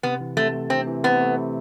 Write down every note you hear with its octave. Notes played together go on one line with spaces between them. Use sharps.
C3 B3
E3
C3 A3
A3
C3 C4
E3
C3 B3
A3
C3